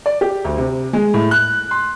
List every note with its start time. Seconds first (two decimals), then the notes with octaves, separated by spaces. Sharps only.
0.06 D5
0.21 G4
0.45 D2
0.58 C3
0.93 G#3
1.14 A2
1.31 F#6
1.71 C6